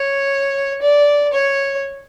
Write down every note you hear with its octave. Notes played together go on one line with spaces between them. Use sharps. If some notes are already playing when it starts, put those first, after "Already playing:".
Already playing: C#5
D5
C#5